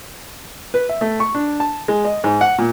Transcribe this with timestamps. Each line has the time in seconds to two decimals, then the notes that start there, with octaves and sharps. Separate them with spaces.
0.74 B4
0.89 E5
1.01 A3
1.20 C#6
1.35 D4
1.60 A5
1.88 G#3
2.05 D#5
2.24 G#2
2.41 F#5
2.58 A#2